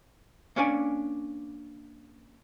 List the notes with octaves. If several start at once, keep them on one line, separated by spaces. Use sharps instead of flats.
A#3 C#4 D4 C#5 D5 G#5